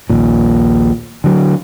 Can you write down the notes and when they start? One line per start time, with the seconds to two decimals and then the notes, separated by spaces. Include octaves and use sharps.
0.10 A#1 D#2 A#2
1.24 D3 F#3